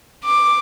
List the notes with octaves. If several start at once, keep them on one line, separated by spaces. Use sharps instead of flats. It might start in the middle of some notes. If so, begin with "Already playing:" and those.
D6